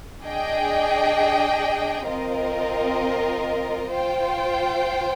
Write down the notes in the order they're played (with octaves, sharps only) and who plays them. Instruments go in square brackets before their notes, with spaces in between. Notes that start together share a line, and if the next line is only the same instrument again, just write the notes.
[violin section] D4 G#4 D#5 G5
C4 F4 A#4 D#5
F4 C5 G5